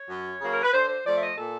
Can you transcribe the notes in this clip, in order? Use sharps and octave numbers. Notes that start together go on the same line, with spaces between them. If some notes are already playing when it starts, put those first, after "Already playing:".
Already playing: C#5
F#2
C#3 F#3 A#3
A#4
B4
D3 C5
C5
F3 A3 D5
E5
D#5
A#2 A4